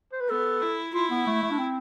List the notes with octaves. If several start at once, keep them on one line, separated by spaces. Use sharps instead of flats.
C5
B4
B3 A4
E4
E4 F4
B3
A3
A3
D4
C4